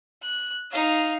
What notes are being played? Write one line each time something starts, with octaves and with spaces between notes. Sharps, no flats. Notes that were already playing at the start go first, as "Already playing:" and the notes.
F#6
D#4 F5